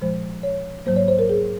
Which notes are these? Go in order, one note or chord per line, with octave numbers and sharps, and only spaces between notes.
A#2 F3 G#3 C5
C#5
G#2 F#3 A#3 C5
C#5
C5
A#4
G#4